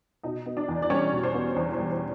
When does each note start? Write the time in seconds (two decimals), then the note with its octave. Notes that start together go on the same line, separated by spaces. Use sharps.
0.23 B2 D#4 D#5
0.46 B3
0.57 D4 D5
0.68 E2
0.82 D5
0.90 G3 C#4 C#5
1.12 B2
1.23 C5
1.34 B3
1.56 E2 C5
1.73 C5
1.79 G3
1.90 C5